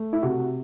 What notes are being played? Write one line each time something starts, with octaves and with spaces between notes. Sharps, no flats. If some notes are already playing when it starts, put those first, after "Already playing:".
Already playing: A3
E4
C3 F#4